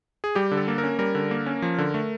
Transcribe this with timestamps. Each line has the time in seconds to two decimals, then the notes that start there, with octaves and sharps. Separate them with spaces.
0.24 G#4
0.35 G3 G4
0.51 D3
0.57 A4
0.68 A#3
0.78 A#4
0.83 C#4
0.99 G3 A#4
1.15 D3
1.31 A#3
1.46 C#4
1.62 F3
1.78 D3
1.94 A3